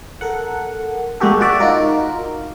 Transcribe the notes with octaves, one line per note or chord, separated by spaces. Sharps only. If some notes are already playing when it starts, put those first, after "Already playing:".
A4 A#4 F#5
G#3 A#3 F#4 G4 A4
F#4 D5 E5
D#4 F4 F#4 A#4